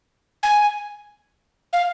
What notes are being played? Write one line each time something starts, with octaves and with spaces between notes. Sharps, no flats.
G#5
F5